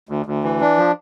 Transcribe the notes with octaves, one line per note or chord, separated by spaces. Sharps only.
D2
D2
E3
D4
F3